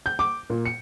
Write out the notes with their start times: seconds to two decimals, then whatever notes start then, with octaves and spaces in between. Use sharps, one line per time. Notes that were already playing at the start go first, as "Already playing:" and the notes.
0.06 G6
0.19 D6
0.50 A#2
0.65 C#7